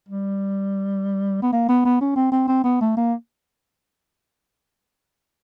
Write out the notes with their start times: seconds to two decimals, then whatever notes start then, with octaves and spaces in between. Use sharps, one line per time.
0.08 G3
1.42 B3
1.53 A#3
1.69 B3
1.85 B3
2.01 C#4
2.16 C4
2.32 C4
2.48 C4
2.64 B3
2.81 A3
2.97 A#3